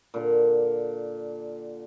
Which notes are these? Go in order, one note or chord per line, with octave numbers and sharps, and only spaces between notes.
A#2 D3